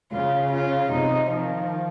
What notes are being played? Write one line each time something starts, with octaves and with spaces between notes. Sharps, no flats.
C#3 F4
F4
C3 D#4
D#3 F3